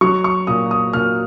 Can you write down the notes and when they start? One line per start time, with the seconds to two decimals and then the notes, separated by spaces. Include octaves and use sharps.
0.01 F#3 C#6
0.24 C#6
0.47 A#2 D#6
0.71 D#6
0.93 A#2 F6